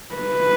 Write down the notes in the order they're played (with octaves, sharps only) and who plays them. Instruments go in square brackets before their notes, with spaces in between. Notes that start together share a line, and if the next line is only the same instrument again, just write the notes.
[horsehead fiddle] B4